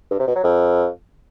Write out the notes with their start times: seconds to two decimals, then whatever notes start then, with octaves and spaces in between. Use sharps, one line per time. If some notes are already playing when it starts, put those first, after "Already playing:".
0.11 G2
0.19 C3
0.27 B2
0.36 F#3
0.44 F2